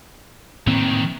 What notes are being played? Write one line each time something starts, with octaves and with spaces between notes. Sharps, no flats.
A2 D#3 E3 A#3 C4